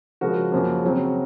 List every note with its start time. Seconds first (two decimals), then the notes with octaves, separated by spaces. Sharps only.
0.21 C#3 F3 G#3 F#4 A#4
0.52 F#2 C#3 F3 A#3
0.83 C#3 F#3 C4